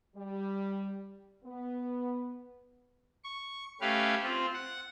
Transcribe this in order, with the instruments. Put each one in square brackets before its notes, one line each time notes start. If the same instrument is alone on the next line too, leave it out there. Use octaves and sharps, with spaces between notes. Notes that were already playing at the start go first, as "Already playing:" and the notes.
[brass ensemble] G3
B3
[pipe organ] C#6
A3 C#4 G4 B4 F5
C4 F4
F#5